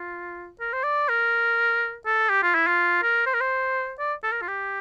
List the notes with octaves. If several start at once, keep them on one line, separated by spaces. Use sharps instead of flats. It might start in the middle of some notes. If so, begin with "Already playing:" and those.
Already playing: F4
A#4
C5
D5
A#4
A4
G4
F4
E4
F4
A#4
C5
A#4
C5
D5
A4
A#4
F4
G4